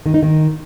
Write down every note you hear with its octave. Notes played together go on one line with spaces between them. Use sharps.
D#3
D#4
D#3